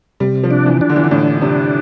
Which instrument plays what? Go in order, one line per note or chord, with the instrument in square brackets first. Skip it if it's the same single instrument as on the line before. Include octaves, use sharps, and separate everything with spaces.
[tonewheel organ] C3 [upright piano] G3
[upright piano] F3
[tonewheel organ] D4
[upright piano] E3
[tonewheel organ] D4
[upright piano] D3
E3
D3
[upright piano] A2 [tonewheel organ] D4
[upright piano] C3 [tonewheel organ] D4